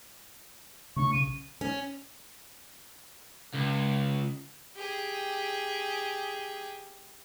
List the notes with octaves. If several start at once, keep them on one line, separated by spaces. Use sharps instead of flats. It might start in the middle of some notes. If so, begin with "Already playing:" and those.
C#3 A3 D4 C#6
B1 C#3 D#7
C#4
C#2
G4 G#4